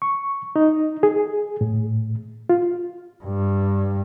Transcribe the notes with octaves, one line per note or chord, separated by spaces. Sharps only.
C#6
D#4
G#4
A2
F4
G2